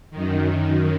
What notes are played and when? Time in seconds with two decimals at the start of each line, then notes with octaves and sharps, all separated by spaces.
0.11 F#2 D#3